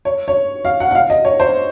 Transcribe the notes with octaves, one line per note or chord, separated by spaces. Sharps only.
C#5
C#5
F5
F#5
F#5
F5
D#5
C#5
C5